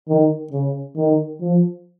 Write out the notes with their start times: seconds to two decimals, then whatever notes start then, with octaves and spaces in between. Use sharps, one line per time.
0.09 D#3
0.53 C#3
0.97 D#3
1.41 F3